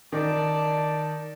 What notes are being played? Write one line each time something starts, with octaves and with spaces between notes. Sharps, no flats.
D#3 D5 A5